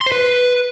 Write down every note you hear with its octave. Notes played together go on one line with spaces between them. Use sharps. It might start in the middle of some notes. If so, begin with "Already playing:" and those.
C6
C5
B4